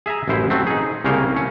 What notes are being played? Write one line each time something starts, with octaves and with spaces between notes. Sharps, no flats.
G#4 E5 G#5 A#5
A1 F#2 E4 C5
F#3 A3 C4
D#4 G#4
C2 C#3 A#3 C#4 A#4 C5
A3 C#4